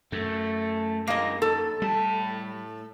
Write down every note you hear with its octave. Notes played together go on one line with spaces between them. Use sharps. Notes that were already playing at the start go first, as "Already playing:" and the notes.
F#2 A3
B1 G#3 A#3 D#5
D#2 A4
A2 G3 A5